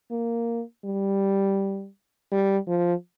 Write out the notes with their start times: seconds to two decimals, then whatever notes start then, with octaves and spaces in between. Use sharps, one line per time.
0.11 A#3
0.85 G3
2.32 G3
2.68 F3